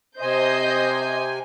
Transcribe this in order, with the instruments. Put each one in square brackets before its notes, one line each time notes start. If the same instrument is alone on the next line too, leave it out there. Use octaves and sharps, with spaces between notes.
[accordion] C3 G#5 [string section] C5 D#5 G6